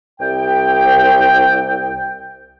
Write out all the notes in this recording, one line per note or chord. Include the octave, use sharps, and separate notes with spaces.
C2 G5